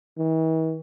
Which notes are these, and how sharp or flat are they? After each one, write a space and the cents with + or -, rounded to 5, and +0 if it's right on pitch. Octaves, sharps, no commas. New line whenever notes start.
E3 -45